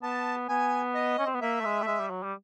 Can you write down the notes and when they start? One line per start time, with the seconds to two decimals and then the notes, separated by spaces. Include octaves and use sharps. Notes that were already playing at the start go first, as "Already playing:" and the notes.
0.03 B3 A5
0.49 B3 G#5
0.95 D#5
1.19 C#4
1.26 C4
1.34 B3
1.41 A#3 E5
1.60 A3
1.65 G#3
1.82 A3
1.87 G#3
2.00 G3
2.10 F#3
2.23 G3